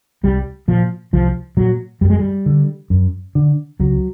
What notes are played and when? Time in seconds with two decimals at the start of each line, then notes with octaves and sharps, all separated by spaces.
0.23 C2 G3
0.68 A#2 F3
1.13 C2 F3
1.57 A#2 F#3
2.01 F#2 G3
2.10 G#3
2.20 G3
2.46 D3
2.90 F#2
3.35 D3
3.79 C#2 F#3